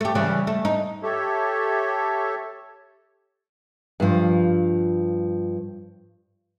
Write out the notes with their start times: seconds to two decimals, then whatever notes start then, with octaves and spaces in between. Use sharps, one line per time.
0.01 A3 G4
0.15 C#3 E3 G3
0.47 A3
0.65 D#4
1.03 G4 A4 C#5 E5
4.00 G2 F3